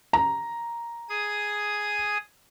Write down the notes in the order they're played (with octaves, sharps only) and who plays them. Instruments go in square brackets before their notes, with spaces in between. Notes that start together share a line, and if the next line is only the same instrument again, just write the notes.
[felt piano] A#5
[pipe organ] G#4 D#6